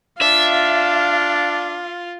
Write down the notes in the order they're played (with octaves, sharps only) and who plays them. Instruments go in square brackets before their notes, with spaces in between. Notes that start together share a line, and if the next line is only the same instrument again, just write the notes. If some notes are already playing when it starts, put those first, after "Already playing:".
[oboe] D4 [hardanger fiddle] F4 [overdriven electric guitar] E5 [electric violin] F5